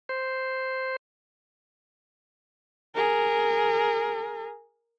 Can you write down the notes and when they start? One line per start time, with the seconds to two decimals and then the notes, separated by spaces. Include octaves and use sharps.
0.09 C5
2.95 G#4 A#4